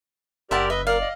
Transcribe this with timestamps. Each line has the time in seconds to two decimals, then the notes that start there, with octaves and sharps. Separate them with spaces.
0.51 F#1 G4 A#4 D5 E5 F#5 A5 C6
0.70 B4 D#5 E5
0.87 A#4 D5 F5
1.01 D#5